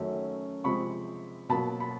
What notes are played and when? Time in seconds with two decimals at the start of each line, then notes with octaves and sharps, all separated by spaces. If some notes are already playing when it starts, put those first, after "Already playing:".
Already playing: F#2 D#3 F#3 A3 C#4
0.64 C3 F3 G#3 C4 B5 C#6
1.49 B2 F#3 A#3 A5 B5
1.80 B5